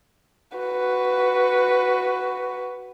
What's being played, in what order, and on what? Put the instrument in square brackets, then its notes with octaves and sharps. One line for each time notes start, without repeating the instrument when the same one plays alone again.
[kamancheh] F#4 B4